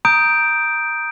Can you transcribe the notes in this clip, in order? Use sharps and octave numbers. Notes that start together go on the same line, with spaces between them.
A#5 D#6 G6 D7